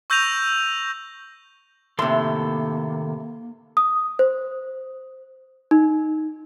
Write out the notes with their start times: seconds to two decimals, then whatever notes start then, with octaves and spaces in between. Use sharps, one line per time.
0.10 C#6 E6 G6 A#6 D#7 F7
1.99 A2 C3 D#3 A#3 A4 C6
3.77 D#6
4.19 C5
5.71 D#4